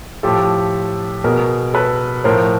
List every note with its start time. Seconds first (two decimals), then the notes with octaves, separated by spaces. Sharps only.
0.23 A2 F3 G4 A4
1.24 B2 G#4 A#4
1.74 A4 B4
2.24 A2 F3 A#4 C5